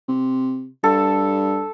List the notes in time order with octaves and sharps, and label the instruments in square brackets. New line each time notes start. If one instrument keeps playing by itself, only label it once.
[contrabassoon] C3
[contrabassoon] G2 [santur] A4